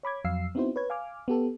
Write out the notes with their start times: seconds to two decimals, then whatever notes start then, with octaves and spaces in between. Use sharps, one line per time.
0.03 C#5 B5 D6 G#6
0.25 F2 F#3 F5 E6 C7
0.55 B3 C4 D#4 E4 F#4 C5
0.76 B4 C#5 G#6
0.90 F5 G#5 D6 F6
1.28 B3 G4 A4